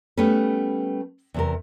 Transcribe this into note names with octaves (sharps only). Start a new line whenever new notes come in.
G3 A3 B3 C#4 B4
E2 C3 A#4